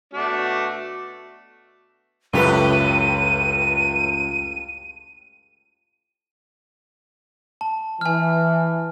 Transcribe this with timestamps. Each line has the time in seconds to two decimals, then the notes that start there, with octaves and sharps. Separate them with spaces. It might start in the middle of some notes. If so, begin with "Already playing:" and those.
0.14 B2 A3 D4 F#4
2.33 C#2 F#2 A2 G4 A4 B4 D#7
7.61 A5
8.01 E3 G#5 F6